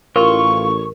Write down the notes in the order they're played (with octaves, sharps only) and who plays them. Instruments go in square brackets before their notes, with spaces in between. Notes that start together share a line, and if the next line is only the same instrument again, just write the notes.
[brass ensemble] A1 [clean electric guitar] F4 [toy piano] A#4 [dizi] C#6